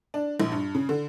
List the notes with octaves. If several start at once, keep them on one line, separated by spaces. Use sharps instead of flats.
D4
A#1
G2
C#3
D3